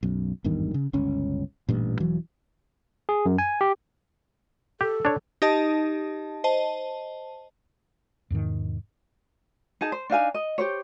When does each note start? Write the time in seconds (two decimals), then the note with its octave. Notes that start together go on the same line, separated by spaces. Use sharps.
0.03 B1 F#2
0.44 G#1 E2 G2 D#3
0.74 C#3
0.93 G1 C#2 C#4
1.69 A1 G2 A#2
2.00 E1 E3 F#3
3.09 G#4
3.26 F#2
3.38 G#5
3.61 G4
4.81 G4 A4
5.05 D4 C#5
5.42 D#4 G4 D#5 A5
6.44 C5 D#5 A5
8.30 E2 G#2 C3 D#3
9.81 D#4 G#4 A5
9.92 C5
10.10 D4 D#4 F5 G#5
10.34 D#5
10.58 G4 C5 C#5